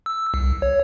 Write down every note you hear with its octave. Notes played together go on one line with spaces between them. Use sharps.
E6
C2
C#5